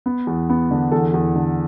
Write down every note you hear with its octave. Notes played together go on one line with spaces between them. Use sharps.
B3
E2
B3
D3
E2 A4
E2
D3